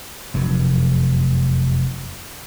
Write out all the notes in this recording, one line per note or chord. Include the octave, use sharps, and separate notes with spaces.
F1 F#2